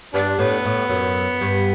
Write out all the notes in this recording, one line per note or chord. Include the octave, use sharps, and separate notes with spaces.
G2 G3 B3 D4
A2 B3
A2
F#2
G2